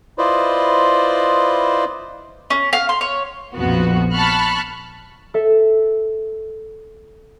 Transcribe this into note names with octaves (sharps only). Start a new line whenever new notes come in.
E4 F4 B4 C5 D5 D#5
C#4
F5
C6
C#5
A#1 F2 F3 B3 F#4
A5 B5 C#6 F6 F#6
A4 E5